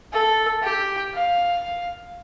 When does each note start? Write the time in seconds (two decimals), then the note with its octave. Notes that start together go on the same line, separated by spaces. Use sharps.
0.12 A4
0.63 G4
1.14 F5